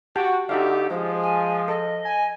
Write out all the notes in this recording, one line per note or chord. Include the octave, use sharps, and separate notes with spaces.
F#4 G4 G5 A5
D3 D#4 F#4 G4 E5 F5
F3 G#3 C5
G#5
A4 D#5
G#5